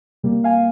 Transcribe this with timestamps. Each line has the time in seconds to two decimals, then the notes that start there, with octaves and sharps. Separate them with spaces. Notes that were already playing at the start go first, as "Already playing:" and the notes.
0.23 C3 G3 A#3
0.44 F5 G#5